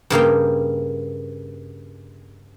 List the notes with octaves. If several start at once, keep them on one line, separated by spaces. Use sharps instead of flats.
G2 C#3 A#3 G5